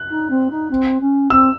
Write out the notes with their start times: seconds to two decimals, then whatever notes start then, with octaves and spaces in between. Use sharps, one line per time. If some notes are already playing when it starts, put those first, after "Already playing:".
Already playing: F#6
0.09 D#4
0.30 C4
0.50 D#4
0.70 C4
1.00 C#4
1.30 C4 E6